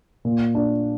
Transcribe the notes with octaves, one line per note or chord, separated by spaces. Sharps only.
A#2
D4